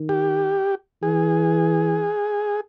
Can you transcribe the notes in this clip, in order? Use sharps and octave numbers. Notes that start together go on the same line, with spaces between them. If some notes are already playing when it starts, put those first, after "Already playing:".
Already playing: D#3
G4
E3 G#4